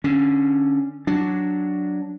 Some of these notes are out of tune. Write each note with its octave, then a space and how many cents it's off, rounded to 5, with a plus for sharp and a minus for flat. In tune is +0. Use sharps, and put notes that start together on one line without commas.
D3 +10 C#4 +0
F#3 +0 D4 -5